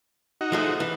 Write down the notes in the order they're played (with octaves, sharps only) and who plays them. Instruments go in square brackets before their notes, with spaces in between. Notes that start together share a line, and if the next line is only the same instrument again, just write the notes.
[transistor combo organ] D#4 F#4
[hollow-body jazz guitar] F3 G#3 A3
E3